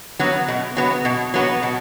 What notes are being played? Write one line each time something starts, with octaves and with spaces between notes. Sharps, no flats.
F#3 B3 F#4
B2
F#3 B3 F#4
B2
F#3 B3 F#4
B2